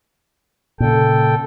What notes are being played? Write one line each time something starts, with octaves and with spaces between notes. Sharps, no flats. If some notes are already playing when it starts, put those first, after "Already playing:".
A#2 C#3 A4 G5